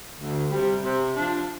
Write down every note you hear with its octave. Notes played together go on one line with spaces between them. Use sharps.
D2
C3 G3
C3
F3 D4